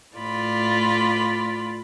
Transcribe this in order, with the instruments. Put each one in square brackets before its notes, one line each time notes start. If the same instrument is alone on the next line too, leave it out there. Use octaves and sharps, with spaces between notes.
[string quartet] A2 F4 D5 B5